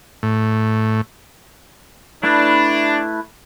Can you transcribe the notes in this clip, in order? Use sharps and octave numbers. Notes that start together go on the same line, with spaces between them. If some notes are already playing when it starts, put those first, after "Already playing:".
A2
A3 D4 E4 B4